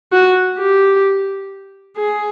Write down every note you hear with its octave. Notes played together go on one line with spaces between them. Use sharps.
F#4
G4
G#4